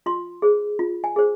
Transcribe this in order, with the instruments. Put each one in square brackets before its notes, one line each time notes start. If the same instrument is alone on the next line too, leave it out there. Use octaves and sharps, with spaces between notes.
[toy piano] F4 C6
G#4 C5
F4
G#5
G#4 C5